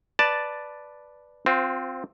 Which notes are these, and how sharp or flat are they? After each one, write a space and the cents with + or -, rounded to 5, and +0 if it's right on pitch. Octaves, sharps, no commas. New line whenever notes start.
B4 +0 D5 +0 A5 +0
C4 +0 F4 +25 C5 -25